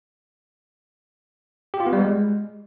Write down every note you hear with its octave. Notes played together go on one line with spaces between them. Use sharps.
G4
F4
B3
G3
G#3